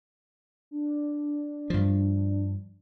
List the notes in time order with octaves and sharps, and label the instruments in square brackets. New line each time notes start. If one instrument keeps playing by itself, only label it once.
[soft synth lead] D4
[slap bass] G2 F3